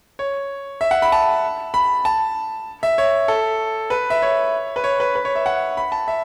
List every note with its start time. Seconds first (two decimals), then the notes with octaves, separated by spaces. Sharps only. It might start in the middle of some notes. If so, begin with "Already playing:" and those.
0.19 C#5
0.81 E5
0.91 F#5
1.02 B5
1.12 A5
1.74 B5
2.05 A5
2.83 E5
2.98 C#5
3.28 A4
3.90 B4
4.10 E5
4.22 C#5
4.76 B4
4.84 C#5
5.00 B4
5.15 B4
5.25 C#5
5.35 E5
5.46 F#5
5.77 B5
5.92 A5
6.08 E5